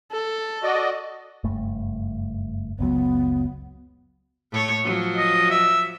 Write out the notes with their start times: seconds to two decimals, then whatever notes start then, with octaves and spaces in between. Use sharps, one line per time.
0.12 A4
0.63 F#4 D5 D#5
1.44 F#1 G2 A3
2.79 F#1 C#2 F#3 B3
4.52 A2 A3 C#5
4.84 F3 F#3
5.17 D#5
5.50 E5